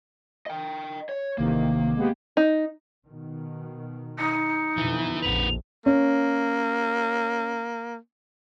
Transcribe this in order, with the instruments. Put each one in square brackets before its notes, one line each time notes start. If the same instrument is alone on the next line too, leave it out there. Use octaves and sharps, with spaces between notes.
[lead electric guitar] D#5 G5
C#5
[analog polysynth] A1 C3 D#3 [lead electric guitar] A#3
[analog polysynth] G#3 B3 G4
[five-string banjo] D#4
[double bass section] B2 D#3
[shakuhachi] D#4 [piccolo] C#7
[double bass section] F2 B2 D3 [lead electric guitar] E3 E4
[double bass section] A#1 F2 [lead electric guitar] A#3 B4 [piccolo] F7
[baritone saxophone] A#3 [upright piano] C#4